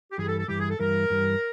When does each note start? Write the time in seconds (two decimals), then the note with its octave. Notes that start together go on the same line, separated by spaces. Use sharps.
0.12 G4
0.18 G2 E3 G3 G#4
0.28 A4
0.38 A4
0.48 G2 E3 G3 G4
0.59 G#4
0.70 A4
0.79 G2 E3 G3 A#4
1.10 G2 E3 G3